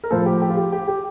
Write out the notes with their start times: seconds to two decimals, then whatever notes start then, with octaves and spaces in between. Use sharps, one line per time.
0.04 A#4
0.10 A2 F3 A4 C5
0.26 G4
0.42 G4
0.50 F4
0.57 G4
0.72 G4
0.88 G4